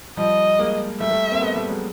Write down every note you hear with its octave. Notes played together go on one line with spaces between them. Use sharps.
F3 G3 D#5
G#3 A#3
G3 A3 E5
G3 A3
A#3 C4
A3 B3
G3 A3
F#3 G#3